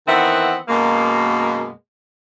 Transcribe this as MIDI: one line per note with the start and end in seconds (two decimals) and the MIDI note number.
0.07 0.56 51
0.07 0.56 52
0.07 0.56 59
0.07 0.56 60
0.07 0.56 76
0.07 0.56 78
0.68 1.68 42
0.68 1.68 47
0.68 1.68 56
0.68 1.68 58